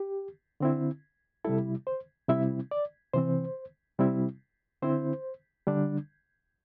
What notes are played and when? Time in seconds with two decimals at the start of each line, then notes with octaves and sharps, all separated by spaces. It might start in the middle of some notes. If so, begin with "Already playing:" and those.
Already playing: G4
0.60 D3 C4 E4
1.44 C3 G3 E4 A4
1.87 C5
2.29 C3 G3 C4 E4 E5
2.71 D5
3.14 C3 E3 C4 C5
3.98 C3 G3 C4 E4
4.82 D3 C4 E4 C5
5.67 D3 G3 D4